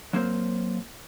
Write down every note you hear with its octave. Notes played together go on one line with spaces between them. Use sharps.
F#3 A#3 C4 A#4 C5